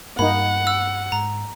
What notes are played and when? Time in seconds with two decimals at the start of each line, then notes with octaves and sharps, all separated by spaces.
0.19 G2 A#3 D#4 F#5 B5
0.67 E6
1.12 G#2 A#5